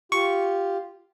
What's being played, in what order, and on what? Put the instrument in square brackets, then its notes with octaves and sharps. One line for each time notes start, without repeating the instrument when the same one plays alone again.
[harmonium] F4 G4 [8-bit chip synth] C#6